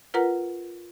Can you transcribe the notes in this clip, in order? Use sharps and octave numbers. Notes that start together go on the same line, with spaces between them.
F4 A#4 B4 F#5 A#5